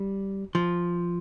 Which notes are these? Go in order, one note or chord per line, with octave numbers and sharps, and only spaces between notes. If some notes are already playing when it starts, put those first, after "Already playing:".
Already playing: G3
F3